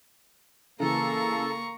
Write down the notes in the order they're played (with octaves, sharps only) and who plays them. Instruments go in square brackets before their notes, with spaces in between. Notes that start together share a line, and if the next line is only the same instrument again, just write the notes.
[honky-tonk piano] C#3 E3 [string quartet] A#3 [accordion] A4 [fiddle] A#5 C#6